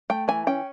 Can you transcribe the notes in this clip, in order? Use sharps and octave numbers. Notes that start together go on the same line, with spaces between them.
A3 G5
E3 G#5
C#4 G5